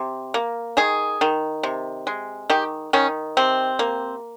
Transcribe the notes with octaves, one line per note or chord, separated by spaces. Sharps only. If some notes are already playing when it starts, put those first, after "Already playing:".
Already playing: C3
A#3
D#3 G#4
D#3
C3
G#3
D#3 G4
D#3 C#4
C3 C4
A#3